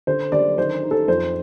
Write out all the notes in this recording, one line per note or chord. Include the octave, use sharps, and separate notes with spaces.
D3 C5
D3 D5
D#3 C5
D#4
A4
F2 C5